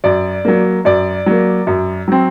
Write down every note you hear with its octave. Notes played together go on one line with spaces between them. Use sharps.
F#2 D5
F#3 A#3
F#2 D5
F#3 A#3
F#2
F#3 C4